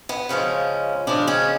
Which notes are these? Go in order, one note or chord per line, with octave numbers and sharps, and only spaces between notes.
B3
C#3 F3 G#3 C#4
C#3 F3 G#3 D4
C#4